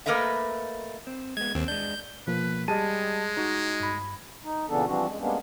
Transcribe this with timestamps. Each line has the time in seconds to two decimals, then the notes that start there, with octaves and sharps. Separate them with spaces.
0.06 A3 A#3 A#4 B4 D#5 E5
1.07 C4
1.37 G#3 B3 G#6
1.55 D#2 C4
1.68 G#3 D4 G6
2.27 B2 F3 A#3 B4
2.68 G3 G#3 G#4 D#5 A5 D#7
3.37 D#4 F#4
3.80 G2 B5
4.44 D#4
4.69 A#2 C#3 E3 B3 D4 A4
4.86 E3 F3 G3 C4 D4 F#4
5.07 F#2 G#3
5.20 G3 G#3 A#3 B3 C#4 D4